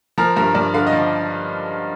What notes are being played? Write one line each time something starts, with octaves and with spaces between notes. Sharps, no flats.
F3 A#4 A#5
G2 A#4 A#5
G2 D5
D3 F5
D#5
F3